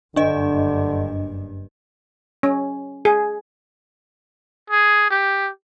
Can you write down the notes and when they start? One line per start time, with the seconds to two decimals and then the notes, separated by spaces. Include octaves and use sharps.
0.16 F#1 G2 D3 D4 D#5
2.43 C#4
3.05 G#4
4.70 G#4
5.10 G4